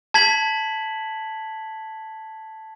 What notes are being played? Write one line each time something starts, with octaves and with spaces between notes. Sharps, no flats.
A5 G#6 B6 F#7